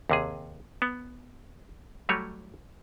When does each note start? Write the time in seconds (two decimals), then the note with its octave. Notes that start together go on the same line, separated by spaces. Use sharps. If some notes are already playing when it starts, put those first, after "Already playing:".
0.10 D#2 C3 G#4
0.82 B3
2.09 F#3 G3 A3 C#5